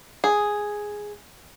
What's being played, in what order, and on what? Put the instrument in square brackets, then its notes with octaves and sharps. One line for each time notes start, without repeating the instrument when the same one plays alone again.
[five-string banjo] G#4